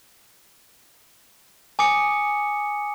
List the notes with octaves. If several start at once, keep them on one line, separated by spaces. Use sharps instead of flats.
G#5 D6 D#6 C#7